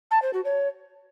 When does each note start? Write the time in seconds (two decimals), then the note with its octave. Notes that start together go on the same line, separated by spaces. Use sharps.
0.11 A5
0.22 C5
0.33 F#4
0.45 C#5